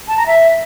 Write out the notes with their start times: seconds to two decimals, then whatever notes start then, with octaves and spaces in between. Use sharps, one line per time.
0.08 A5
0.17 A#5
0.27 E5